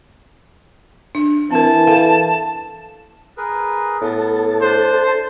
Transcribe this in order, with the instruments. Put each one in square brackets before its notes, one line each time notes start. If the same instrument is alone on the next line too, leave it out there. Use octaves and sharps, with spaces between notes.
[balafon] D4
[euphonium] E3 [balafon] C4 A#4 [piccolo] A5
[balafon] A4 F5
[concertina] G#4 A#4 B4
[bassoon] A2 [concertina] B3 [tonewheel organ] A4 A5
[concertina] D4 [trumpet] C5